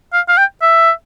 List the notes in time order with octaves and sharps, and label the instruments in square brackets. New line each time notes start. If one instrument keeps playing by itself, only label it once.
[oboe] F5
F5
G5
E5